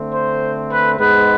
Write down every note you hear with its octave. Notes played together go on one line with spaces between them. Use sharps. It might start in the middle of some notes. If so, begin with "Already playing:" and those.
Already playing: D3 A3 C4
C5
B4
G#2 G#3 B3 B4